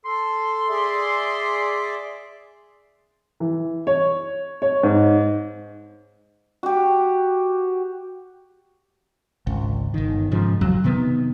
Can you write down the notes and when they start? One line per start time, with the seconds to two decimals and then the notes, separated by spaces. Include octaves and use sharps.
0.05 A4 C6
0.69 G#4 D5 E5
3.40 E3
3.87 C#5
4.62 C#5
4.83 G#2
6.63 F#4 G4
9.47 G#1 C#2
9.94 G1 D#3
10.31 G#2 C#3 F3
10.61 A1 F2 F#3
10.84 C3 D#3 B3